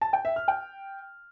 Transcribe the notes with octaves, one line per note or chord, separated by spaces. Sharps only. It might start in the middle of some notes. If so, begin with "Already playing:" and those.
A5
G5
E5
F6
G5